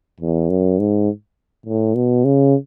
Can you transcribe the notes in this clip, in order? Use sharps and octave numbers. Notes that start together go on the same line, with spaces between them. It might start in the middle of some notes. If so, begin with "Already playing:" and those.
E2
F#2
G#2
A2
B2
C#3